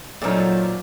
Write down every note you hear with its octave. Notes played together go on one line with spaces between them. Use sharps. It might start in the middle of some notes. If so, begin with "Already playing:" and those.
A#2 F3 F#3 A3 C#4 D#4